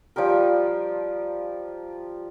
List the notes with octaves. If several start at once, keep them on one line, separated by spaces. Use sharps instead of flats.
F3 G3 G4 A#4